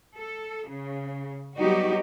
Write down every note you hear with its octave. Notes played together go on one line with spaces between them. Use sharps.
A4
C#3
F#3 G3 B3 D#4 F#4 G4